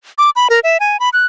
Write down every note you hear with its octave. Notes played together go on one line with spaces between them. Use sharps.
D6
B5
A#4
E5
G#5
B5
F#6